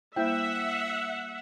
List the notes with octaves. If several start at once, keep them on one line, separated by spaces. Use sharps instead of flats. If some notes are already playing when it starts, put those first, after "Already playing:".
G3 A#3 E4 C5 E5 F#5 G5